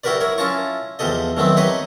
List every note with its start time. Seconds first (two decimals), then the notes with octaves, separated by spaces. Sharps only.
0.04 E4 F#4 G4 A#4 B4 D5
0.21 E4 A#4 C#5
0.38 C#4 E4 F4 A5 A#5 C#6
0.99 E2 F3 G4 A4 D#5
1.37 D#3 E3 F#3 A3 B3 C4
1.57 D#4 G4 B4 C#5 D#5